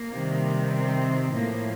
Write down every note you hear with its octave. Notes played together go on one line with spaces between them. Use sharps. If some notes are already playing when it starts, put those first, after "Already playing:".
Already playing: A#3
C3 D#3 G3
C4
A2 F3 A#3